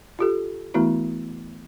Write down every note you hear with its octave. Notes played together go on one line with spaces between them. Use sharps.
F4 G4 A4
E3 A3 B3 E4 F#4